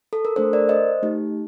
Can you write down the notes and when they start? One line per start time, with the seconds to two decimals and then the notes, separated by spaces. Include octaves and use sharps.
0.13 A4
0.25 A#4
0.36 A3 D4 A4 C5
0.53 A#4 D5
0.69 C5 D#5
1.03 A3 D#4 G4